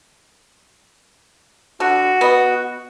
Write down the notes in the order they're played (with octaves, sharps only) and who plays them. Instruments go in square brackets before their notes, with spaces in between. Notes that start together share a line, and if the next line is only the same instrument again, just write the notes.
[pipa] D3 [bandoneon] F#4
[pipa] B3 D#5